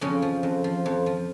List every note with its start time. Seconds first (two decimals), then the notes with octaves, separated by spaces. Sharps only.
0.01 F2 C#3 C#4
0.22 F3
0.43 F2
0.64 F3
0.86 F2
1.06 F3